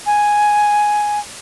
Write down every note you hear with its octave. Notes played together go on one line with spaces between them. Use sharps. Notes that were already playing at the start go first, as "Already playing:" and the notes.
G#5